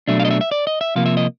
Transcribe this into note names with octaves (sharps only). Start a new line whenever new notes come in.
B2 F#3 A3 D4 E5
F5
D#5
E5
E5
D5
D#5
E5
C3 F3 A#3 F5
E5
D#5